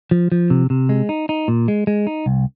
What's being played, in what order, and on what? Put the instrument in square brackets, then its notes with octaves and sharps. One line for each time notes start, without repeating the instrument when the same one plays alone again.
[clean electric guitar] F3
F3
C3
C3
G#3
D#4
D#4
A#2
G#3
G#3
D#4
C2